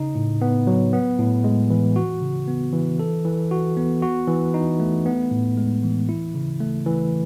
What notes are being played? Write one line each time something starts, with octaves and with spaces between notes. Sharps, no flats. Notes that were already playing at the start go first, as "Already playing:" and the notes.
Already playing: C#3 D#4
A2
B3
F#3
B3
A2
G#3
E3
F#4
C#3
B3
E3
A4
E3
F#4
B3
F#4
E3
D#4
A3
B3
A2
G#3
E3
E4
C#3
A3
E3